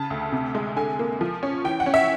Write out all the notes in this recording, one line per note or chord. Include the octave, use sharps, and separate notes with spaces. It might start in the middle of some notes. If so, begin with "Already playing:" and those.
Already playing: C#3 A5
D2
C3
G#3
D3 G#5
A#3
F3
C#4
E3 G5
F#5
C#4
E5